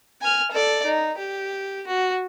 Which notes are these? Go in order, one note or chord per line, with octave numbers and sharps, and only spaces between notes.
G#5 F6
A4 D5
D#4
G4
F#4